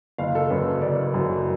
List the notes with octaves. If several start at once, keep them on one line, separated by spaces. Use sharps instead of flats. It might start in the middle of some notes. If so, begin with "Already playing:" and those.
F#1 F5
A4
F#2 C#3 B4
F#1 D5
F#2 C#3